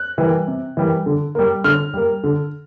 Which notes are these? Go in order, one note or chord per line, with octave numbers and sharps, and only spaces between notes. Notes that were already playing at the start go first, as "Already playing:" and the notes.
Already playing: F#6
E3 G3 A#3
C3
E3 G3 A#3
D3
G3 A#3
D3 F6
G3 A#3
D3